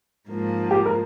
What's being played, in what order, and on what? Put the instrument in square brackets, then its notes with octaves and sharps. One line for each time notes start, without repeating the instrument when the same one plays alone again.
[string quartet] G#2 F3 A#3
[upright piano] G4
A#4